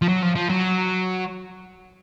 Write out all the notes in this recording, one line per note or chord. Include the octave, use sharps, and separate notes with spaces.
F3
F#3
F3
F3
F#3